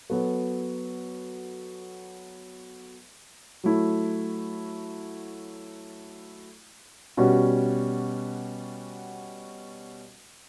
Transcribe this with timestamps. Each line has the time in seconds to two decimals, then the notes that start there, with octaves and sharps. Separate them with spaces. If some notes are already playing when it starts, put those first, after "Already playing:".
0.10 F#3 B3 F#4 A4
3.64 F#3 A3 E4
7.17 B2 G3 C#4 F#4